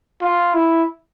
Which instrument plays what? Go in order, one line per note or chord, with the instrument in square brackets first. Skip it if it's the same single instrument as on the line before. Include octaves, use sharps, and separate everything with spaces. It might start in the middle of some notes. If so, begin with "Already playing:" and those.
[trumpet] F4
E4